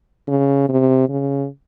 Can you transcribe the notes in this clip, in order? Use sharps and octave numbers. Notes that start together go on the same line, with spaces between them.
C#3
C3
C#3